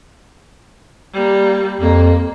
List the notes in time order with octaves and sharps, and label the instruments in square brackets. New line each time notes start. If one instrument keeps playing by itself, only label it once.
[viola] G3 A#3
[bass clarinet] F2 [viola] A#3